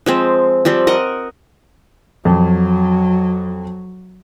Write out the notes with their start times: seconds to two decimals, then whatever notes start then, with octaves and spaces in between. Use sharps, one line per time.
0.06 F3 G#3 C4
0.65 F3 G3 C4
0.87 A#4 D#5 F#5
2.25 F2 F#3